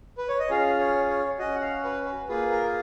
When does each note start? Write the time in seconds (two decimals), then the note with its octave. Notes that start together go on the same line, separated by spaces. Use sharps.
0.18 B4
0.29 C#5
0.39 D#5
0.50 C#4 F4 G#4 F5
0.80 C#5
1.09 C#5
1.39 C#4 F#4 D#5
1.55 F#5
1.62 F5
1.84 B4
2.06 B4
2.29 A#3 F4 G#4 B4
2.51 A#4